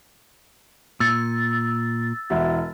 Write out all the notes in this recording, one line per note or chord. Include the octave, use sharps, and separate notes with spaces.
A#2 E6 A6
E1 E4 F#4